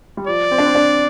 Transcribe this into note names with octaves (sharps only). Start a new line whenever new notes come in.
G3
F3 D5
C4
D4
C4
D4